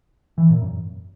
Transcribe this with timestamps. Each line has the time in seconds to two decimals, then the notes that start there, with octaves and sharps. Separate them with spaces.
0.38 E3
0.50 A#2
0.62 F#2